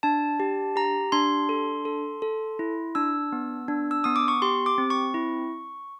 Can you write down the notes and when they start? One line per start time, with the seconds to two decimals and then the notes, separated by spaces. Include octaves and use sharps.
0.03 D4 A5
0.40 G4
0.76 G4 A#5
1.12 D4 C6
1.49 A4
1.85 A4
2.22 A4
2.59 E4
2.95 D4 E6
3.32 B3
3.68 D4
3.91 E6
4.04 B3 D#6
4.16 D6
4.28 C#6
4.42 G4 C6
4.66 D6
4.78 C4
4.90 C#6
5.14 E4